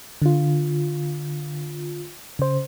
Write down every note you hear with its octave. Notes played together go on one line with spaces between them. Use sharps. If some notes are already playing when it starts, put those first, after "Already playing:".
D3 F4
C#3 C5